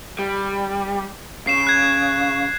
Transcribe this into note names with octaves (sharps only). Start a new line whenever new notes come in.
G3
C#3 C7 E7
F#6 G#6